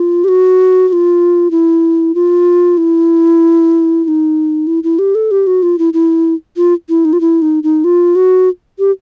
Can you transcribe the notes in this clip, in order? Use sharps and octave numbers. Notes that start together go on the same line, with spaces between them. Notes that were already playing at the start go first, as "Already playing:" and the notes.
Already playing: F4
G4
F#4
F#4
F4
E4
F4
E4
E4
D#4
E4
E4
G4
A4
G4
F#4
F4
E4
E4
F4
E4
D#4
F4
E4
D#4
D#4
F4
F#4
G4